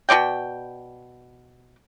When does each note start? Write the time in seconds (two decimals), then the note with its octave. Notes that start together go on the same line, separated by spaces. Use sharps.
0.09 B2 C4 D5 G5